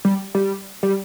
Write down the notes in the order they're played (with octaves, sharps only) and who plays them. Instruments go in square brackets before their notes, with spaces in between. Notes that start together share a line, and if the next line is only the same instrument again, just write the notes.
[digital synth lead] G3
G3
G3